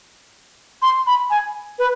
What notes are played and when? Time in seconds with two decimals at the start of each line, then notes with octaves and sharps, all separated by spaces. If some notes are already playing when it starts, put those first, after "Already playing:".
0.82 C6
1.07 B5
1.30 G#5
1.79 B4